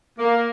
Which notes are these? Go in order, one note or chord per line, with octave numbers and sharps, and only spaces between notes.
A#3